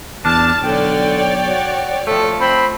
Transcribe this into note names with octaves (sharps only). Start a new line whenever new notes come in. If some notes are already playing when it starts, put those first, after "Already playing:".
E2 D4 A5 F6
B1 D3 C#5 D5 G5
F#4
F3 A3 A4
C4 B5